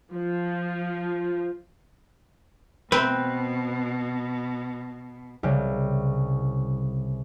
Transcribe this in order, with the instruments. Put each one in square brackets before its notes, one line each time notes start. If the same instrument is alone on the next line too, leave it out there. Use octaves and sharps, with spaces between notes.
[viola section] F3
[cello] B2 [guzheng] C4 [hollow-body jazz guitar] B4
[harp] C2 C#3 G3